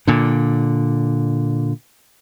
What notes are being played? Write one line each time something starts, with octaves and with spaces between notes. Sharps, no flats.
A#2 D3